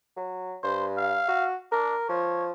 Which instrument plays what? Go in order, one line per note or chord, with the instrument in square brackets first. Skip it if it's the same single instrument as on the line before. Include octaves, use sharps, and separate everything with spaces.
[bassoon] F#3
[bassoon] G2 [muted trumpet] C5
[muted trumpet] F5
[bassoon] F#4
[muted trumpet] D4 [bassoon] A#4
[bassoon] F3 [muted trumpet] C#5